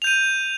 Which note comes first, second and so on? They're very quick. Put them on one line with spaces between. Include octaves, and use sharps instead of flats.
F7 G6 D#7